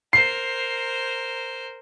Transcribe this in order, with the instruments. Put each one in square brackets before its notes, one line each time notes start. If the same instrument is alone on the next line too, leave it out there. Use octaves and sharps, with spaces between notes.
[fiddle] A#4 C5 [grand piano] C7